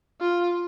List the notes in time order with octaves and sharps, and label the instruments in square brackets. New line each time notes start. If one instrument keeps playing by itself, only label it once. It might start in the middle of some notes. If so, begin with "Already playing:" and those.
[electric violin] F4